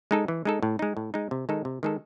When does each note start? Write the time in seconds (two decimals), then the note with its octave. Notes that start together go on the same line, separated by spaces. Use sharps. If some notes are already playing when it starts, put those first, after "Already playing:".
0.11 G#3 D#4 A4
0.28 E3
0.45 G#3 D#4 A4
0.63 A2
0.79 G#3 D#4
0.97 A2
1.14 G#3 D#4
1.31 C3
1.49 D#3 G#3 D#4 A4
1.65 C3
1.83 D#3 G#3 D#4 A4